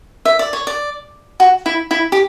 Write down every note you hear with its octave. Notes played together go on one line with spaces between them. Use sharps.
E5
D5
C#5
D5
F#4
E4
E4
G4